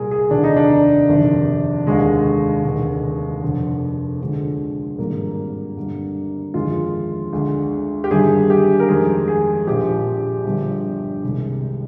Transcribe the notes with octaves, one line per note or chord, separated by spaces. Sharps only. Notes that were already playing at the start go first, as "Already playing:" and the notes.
Already playing: C2 A#2 G3 G#4 A#4
G#4
F1 D#2 D3 D4
D#4
D4
G1 F2 C3 D#3
F1 D#2 D3 G#3
F1 D#2 D3 G#3
F1 F2 D3
D2 D3 F3 G#3
G#1 G2 F3 G#3 A#3
G1 G2 D3
G1 F2 D#3 G#3 F4
D2 D3 G#3
G4
G1 G2 D#3 G3 G#4
G4
A#4
F2 D#3 G#3 G#4
G#4
A#1 A#2 F3 G4
G1 G2 F3
C2 C3 D#3 G#3